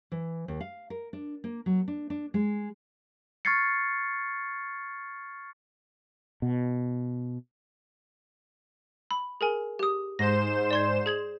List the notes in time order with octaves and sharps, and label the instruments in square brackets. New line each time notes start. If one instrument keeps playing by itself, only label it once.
[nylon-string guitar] E3
D#2
F5
A#4
D4
A#3
F#3
D4
D4
G#3
[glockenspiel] C#6 F6 G#6 A6 C7 C#7
[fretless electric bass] B2
[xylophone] B5
G#4 A#4 G#5
G4 D#6
[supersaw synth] G#2 C5 E7 [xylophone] A#6
[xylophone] D5 C6 G#6
G#4 G#6 F#7